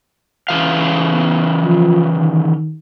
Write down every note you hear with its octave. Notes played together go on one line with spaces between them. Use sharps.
C#3 E3 F5
B3
F3
D#3